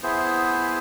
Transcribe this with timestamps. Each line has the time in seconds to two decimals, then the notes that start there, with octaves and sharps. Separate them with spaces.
0.03 B3 E4 G#4 C5